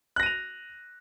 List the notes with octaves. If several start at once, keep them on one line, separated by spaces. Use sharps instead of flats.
F#6 A#6 D#7 F7